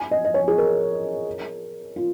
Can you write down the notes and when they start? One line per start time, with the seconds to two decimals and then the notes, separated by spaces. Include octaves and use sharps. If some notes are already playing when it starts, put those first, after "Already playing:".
Already playing: G#5
0.11 D#5
0.25 D#5
0.34 C#5
0.48 G#4
0.58 A#4
1.96 F4